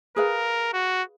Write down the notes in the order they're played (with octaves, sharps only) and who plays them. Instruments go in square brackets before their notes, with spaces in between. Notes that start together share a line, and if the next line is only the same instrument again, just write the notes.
[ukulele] G#4 B4 F5 [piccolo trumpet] A#4
[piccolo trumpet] F#4